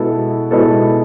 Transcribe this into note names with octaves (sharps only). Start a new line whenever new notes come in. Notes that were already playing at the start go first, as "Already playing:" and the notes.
Already playing: B2 G#3 B3 E4 A4
B2 G#3 B3 E4 A4